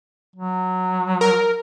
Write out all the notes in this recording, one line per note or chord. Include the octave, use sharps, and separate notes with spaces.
F#3
A#4